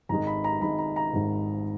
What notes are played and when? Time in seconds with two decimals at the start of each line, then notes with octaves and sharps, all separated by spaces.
0.09 G#1 G#2 D#3 G#3 A#5
0.27 B5
0.44 A#5
0.62 G#1 G#2 D#3 G#3 B5
0.78 A#5
0.96 A#5
1.13 G#1 G#2 D#3 G#3